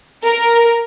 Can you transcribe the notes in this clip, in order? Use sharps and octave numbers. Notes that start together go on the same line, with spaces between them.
A#4